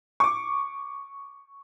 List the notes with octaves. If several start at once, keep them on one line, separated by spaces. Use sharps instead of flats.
C#6 D6